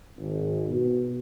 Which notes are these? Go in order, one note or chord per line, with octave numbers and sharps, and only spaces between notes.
G#1
B2